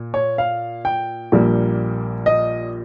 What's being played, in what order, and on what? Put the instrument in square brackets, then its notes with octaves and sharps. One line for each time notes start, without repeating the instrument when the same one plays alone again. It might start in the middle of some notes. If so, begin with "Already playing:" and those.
Already playing: [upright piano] A#2
C#5
F5
G5
A#1 A#2 G3 A#3
D#5